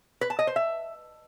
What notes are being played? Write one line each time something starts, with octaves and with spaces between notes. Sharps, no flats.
B4
A5
D#5
C5
E5